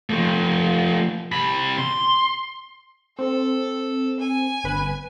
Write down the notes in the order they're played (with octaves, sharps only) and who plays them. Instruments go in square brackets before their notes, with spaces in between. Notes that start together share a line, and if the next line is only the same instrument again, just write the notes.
[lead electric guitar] F3 A3
C3 B5
C6
[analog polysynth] C4 [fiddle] A4
[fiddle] G#5
[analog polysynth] G1 B4